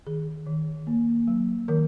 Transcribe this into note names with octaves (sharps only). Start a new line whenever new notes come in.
D#3 G#4
D#3
A#3
F#3
D#3 A#4